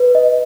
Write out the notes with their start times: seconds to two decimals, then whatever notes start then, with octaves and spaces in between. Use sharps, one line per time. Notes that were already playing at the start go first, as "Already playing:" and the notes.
Already playing: B4
0.15 D#5